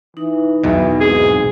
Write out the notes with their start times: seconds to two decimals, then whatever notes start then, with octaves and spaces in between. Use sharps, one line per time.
0.17 E3 D#4
0.64 B1 E2 B2 E4
1.00 G#2 C4 G#4